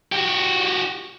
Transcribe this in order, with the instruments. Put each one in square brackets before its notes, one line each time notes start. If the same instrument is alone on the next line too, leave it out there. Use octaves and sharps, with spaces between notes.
[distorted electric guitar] F#4 G4